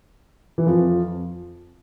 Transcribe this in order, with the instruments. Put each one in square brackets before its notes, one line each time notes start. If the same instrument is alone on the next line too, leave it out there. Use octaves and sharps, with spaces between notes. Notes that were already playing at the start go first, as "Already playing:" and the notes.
[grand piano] E3
F2 F3